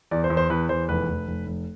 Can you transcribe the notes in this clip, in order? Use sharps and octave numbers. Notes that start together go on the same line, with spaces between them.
E2 D5
C5
E2
C5
E2 B4
E2 C5
F1 B4
F1
F1
F1